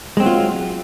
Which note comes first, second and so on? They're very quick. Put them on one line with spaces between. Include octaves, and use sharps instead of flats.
G#3 C4 F#3 F4